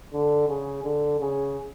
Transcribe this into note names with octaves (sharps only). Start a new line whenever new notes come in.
D3
C#3
D3
C#3